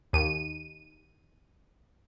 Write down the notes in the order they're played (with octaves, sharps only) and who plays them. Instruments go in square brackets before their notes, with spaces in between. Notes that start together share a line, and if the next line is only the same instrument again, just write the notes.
[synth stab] D#2 D#7